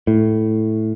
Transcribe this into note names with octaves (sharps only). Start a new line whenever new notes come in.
A2